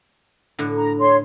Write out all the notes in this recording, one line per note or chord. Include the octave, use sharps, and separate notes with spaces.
A2 D3
A#5
C#5 C6